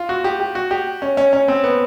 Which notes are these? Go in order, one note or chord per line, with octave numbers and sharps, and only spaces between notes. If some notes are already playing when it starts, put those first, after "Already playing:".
Already playing: F4
F#4
G4
G4
F#4
G4
C#4
C#4
C#4
C4
B3